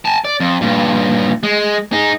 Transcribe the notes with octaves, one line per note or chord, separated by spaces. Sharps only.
G#5 A5
D5
F2
G2 A#2
G#3
D#4 G#4